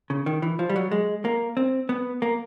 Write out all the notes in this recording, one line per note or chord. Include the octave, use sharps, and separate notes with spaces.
C#3
D#3
E3
F3
G3
F#3
G#3
A#3
C4
B3
A#3